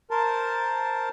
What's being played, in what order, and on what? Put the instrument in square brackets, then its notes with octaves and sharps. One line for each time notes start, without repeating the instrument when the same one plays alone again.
[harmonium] A#4 C5 A5